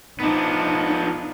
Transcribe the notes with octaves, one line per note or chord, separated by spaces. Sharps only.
F3 B3 D4 D#4